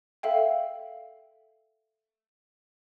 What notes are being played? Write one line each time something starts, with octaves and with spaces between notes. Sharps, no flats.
A4 E5 F5 G5